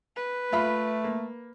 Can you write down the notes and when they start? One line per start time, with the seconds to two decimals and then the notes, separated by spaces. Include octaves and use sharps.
0.16 B4
0.52 A3 F4 E5 B5
1.04 A#3